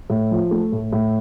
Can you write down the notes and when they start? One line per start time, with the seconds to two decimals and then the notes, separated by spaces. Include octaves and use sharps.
0.10 A2
0.31 F3
0.51 A3
0.72 A2
0.92 A2